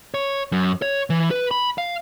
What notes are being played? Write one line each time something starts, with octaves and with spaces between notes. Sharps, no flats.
C#5
F#2
C#5
E3
B4
B5
F5